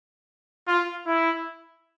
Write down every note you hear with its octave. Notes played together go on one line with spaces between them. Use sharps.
F4
E4